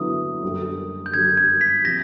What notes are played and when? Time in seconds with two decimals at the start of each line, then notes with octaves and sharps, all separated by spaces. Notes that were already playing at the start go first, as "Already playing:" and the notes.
Already playing: D3 F#3 B3 E4 D#6
0.42 F#2 D3 G3 A#3
1.06 G6
1.14 F#2 D3 G3 A#3 G#6
1.37 G#6
1.61 B6
1.85 C3 F3 A#6